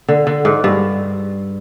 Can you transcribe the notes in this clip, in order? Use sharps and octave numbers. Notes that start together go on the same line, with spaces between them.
D3
D3
G#2
G2